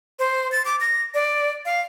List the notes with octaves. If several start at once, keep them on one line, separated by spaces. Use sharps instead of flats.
C5
A6
D6
A#6
D5
F5